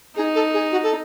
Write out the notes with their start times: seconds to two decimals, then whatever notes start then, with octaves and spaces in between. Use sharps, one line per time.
0.16 D#4 G#4
0.35 A4
0.54 G#4
0.72 F#4
0.83 A4